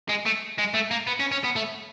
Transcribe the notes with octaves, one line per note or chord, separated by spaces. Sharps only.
G#3
A3
G#3
A3
A#3
B3
C#4
C#4
B3
A3